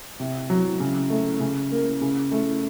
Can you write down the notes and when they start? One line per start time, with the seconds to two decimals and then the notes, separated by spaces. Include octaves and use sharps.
0.20 C3
0.50 F#3
0.80 C#3
1.10 A3
1.40 C#3
1.72 A#3
2.01 C#3
2.32 A3